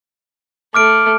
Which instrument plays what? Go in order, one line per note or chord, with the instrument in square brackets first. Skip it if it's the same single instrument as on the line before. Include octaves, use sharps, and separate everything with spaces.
[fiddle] A3 [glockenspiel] D6 F6 D7